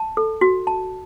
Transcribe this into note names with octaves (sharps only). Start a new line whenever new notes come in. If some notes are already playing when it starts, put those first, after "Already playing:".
Already playing: A5
A4
F#4
A5